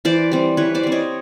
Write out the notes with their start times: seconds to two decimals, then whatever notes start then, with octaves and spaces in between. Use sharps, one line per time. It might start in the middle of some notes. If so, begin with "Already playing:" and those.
0.05 E3 C5 D5
0.32 G3 C4
0.57 E3 B4 C#5
0.75 C5 D5
0.83 G3 C4
0.92 C#5 D#5